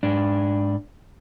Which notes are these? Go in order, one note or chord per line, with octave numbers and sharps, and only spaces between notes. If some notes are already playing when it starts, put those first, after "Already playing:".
G#2 D4